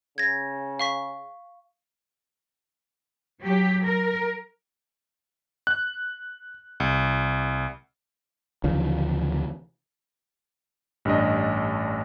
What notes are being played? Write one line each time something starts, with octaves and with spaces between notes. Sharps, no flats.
C#3 G#6 A#6
F5 C#6 B6
F#3 G4
A#4
F#6
C2
D2 C#3 E3 F3
A1 G2 D4 D#5